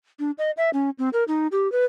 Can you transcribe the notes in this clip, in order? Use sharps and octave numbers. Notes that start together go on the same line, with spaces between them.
D4
D#5
E5
C#4
C4
A#4
D#4
G4
B4